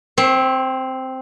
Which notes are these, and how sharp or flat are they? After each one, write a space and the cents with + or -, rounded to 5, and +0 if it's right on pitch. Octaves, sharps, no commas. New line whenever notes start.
C4 +0 C5 +45 E5 +5